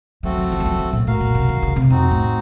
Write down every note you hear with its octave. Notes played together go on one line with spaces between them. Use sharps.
F#3 A3 C4 F#4 A4
F#3
F3
F#3
F3
F#3
A#2
A2 F#4 A#4 F5
A#2
C3
D#3
C#3
C3
F2 C4 D#4 F#4
A2